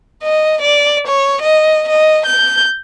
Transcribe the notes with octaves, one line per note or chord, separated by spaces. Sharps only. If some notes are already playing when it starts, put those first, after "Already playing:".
D#5
D5
C#5
D#5
D#5
G6